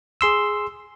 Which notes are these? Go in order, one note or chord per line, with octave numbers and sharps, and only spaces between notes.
G#4 C6 E6